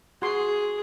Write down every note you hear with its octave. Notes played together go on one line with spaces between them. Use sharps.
F#4 G#4 C6